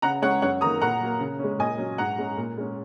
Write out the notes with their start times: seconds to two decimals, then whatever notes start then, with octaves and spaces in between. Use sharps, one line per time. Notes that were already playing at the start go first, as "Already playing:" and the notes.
0.02 C#3 F#5 A#5
0.22 G#3 C#4 C#5 F#5
0.42 F#2 C#5 F#5
0.61 D#3 A#3 A#5 D#6
0.81 A#2 F#5 A#5
1.01 F#3 A#3
1.20 C#3
1.39 G#3 C#4
1.59 A#2 D#5 G#5
1.78 F#3 C#4
1.98 G#2 F#5 A#5
2.18 G#3 C#4
2.37 A#2
2.57 G#3 C#4